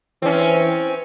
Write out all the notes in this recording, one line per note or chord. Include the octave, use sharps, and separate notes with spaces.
E3 C4 C#4